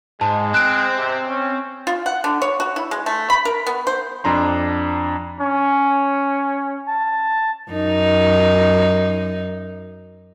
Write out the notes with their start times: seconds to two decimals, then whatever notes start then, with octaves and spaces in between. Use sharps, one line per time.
0.21 G#2 G#3 A5
0.54 C4 F#6 D7
0.98 C3
1.28 C#4
1.87 F4
2.06 F#5
2.24 D3
2.42 C#5
2.60 F#4
2.76 E4
2.91 G#3
3.06 A3
3.30 B5
3.45 A#4
3.67 B3
3.87 C5
4.24 F2 D4 A#5 C6
5.41 C#4
6.88 A5
7.72 F#2 D#4